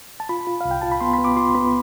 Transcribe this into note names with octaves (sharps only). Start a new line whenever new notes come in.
A5
F4 B5
F4
C2 F5
G5
F4 A5
B5
B3 C6
B5
B3
D6
F4 C6
B3 B5